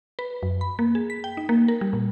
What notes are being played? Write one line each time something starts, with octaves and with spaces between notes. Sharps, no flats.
B4
F#2
B5
A#3
G#4
B6
G5
D#4
A#3
A#4
G3
A#2